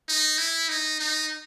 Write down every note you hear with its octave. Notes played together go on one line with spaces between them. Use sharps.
D#4
E4
D#4
D#4